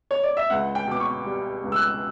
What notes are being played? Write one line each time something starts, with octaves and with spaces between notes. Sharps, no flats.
C#5
D5
E5
C#2 F#5
G5
B2 D6
C#6
G3
C#2
E6
F#6